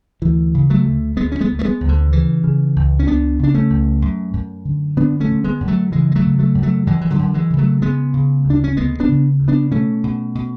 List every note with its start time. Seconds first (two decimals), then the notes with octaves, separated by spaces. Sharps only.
0.22 D2 E3
0.54 C#3
0.70 F#3 A3
0.85 D2
1.17 D2 G#3 B3
1.32 C#4
1.41 G#3 B3
1.49 D2
1.59 A3
1.65 G#3 B3
1.81 D2
1.89 D3
2.12 C#3 E3
2.44 C#3
2.76 C#2
2.99 C#4
3.07 C#2 B3 D4
3.39 C#3 D4
3.54 A3 C#4
3.70 C#2
4.02 F#2
4.33 F#2
4.65 D3
4.97 D3 B3 D4
5.20 A3 C#4
5.28 D3
5.44 G#3 B3
5.60 F#2
5.68 F#3 A3
5.92 C#3 E3 G#3
6.12 G#3
6.16 F#3 A3
6.23 C#3
6.39 F#3 A3
6.55 F#2
6.63 F#3 A3
6.87 F#2 E3 G#3
7.01 E3
7.10 D3 F#3
7.19 F#2
7.34 E3 G#3
7.50 C#3
7.58 F#3 A3
7.82 C#3 G#3 B3
8.14 C#3
8.45 D2
8.50 D4
8.64 C#4
8.77 D2 G#3 B3
9.00 B3 D4
9.08 C#3
9.40 D2
9.48 B3 D4
9.71 B2 A3 C#4
10.03 B2
10.35 B2